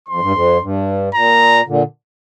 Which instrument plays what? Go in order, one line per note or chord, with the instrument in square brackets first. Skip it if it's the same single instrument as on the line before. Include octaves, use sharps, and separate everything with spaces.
[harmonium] F2 [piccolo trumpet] C6
[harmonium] G2
F2
G2
[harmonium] A#2 [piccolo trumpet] A#5
[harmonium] A#2 D3